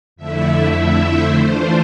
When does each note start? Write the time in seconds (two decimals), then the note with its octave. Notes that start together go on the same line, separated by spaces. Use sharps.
0.16 F2 D3 A3 E4 E5
1.06 C5
1.37 E3 A3 D4 F4 C5